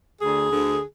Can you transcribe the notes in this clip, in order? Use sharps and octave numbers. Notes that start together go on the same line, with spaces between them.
D2 D3 G#4
D2 D3